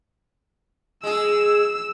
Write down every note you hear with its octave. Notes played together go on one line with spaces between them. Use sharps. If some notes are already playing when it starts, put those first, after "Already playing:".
G#3 G#4 E6